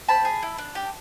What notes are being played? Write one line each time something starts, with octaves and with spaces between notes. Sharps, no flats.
C4 A5 B5
G#4
E4
D4
G4